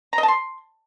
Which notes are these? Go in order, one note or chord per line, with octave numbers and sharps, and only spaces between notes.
A#5
D#5
A5
C6